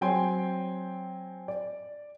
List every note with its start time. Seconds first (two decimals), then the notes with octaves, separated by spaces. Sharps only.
0.01 F#3 C4 G5 G#5 C6
1.48 D5